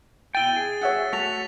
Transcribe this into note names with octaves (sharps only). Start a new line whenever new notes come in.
B2 E4 G5 A6 D#7 G7
G#4
C#5 E5 F#5
A3 F#4 A4 B6 F7